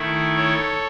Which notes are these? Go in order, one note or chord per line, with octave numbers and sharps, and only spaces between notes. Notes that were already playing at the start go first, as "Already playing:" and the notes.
Already playing: D#3 A3 E4
A4 C#5